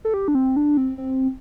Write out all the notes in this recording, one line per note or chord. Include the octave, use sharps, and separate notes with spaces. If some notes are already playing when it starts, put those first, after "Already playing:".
A4
G4
D4
C4
D4
C4
C4